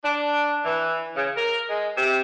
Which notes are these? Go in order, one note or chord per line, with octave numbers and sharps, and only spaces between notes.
D4
E3
C#3
A#4
G#3
C3